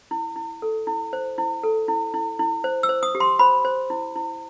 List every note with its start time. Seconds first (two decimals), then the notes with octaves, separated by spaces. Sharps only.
0.11 E4
0.36 E4
0.62 A4
0.87 E4
1.13 C5
1.38 E4
1.63 A4
1.88 E4
2.14 E4
2.39 E4
2.64 C5
2.83 E6
2.89 C5
3.03 D#6
3.15 G4
3.20 C6
3.39 C5 B5
3.65 C5
3.90 E4
4.15 E4